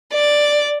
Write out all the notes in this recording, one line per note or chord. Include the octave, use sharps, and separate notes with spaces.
D5